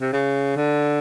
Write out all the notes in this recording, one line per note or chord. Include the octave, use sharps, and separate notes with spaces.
C3
C#3
D3